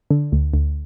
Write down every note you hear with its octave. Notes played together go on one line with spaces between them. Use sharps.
D3
D2
D2